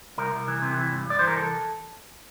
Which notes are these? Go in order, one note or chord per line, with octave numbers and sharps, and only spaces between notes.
C2 A#4
C2
E3
C3
E3
G2
G2 D5
E3 C5
A#4
C2 A4